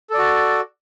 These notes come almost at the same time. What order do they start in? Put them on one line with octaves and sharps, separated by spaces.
A4 D5 F#4